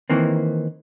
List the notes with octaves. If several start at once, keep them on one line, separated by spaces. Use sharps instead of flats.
D#3 E3 A#3 C4